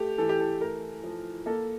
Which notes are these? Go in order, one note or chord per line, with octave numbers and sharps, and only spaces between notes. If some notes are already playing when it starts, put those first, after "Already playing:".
Already playing: A3 G4
E3 A4
G4
A4
A3 A#4
F3
A#3 A4